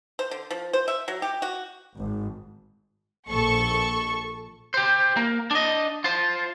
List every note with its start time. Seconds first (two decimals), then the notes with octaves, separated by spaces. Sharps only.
0.19 C5
0.31 D3
0.51 F3
0.73 C5
0.88 E5
1.08 F#3
1.22 G4
1.42 F#4
1.98 G#1
3.26 A#1 A4 C#6
4.74 G4 C5
5.17 A#3
5.51 D4 D#5
6.04 F4 C5